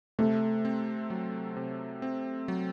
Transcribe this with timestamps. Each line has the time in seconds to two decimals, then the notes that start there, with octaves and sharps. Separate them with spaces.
0.19 C3 A3
0.65 C4
1.10 F#3
1.57 C3
2.02 C4
2.48 F#3